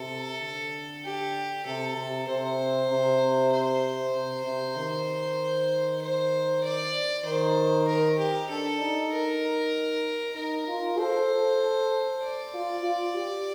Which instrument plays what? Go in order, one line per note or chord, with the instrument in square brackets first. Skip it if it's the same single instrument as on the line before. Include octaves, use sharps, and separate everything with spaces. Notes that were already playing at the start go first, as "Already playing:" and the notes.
Already playing: [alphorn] C3 [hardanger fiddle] A4
[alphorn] D3
[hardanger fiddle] G4
[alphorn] C3 [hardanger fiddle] A4
[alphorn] C3
[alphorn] C3 [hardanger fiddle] C5
[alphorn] C3
[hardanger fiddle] C5
[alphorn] C3
C3
D#3
[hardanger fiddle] C5
D5
[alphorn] D#3 [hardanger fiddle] C5
[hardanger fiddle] A#4
G4
[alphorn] D4 [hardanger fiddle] A4
[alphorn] D#4
[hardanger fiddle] A#4
[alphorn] D#4 [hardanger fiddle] A#4
[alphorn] F4
[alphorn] A4 [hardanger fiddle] C5
[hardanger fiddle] D5
[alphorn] F4
F4
G4